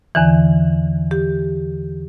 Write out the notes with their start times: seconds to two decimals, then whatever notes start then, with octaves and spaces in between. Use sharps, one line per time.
0.15 E2 D3 E3
1.11 G4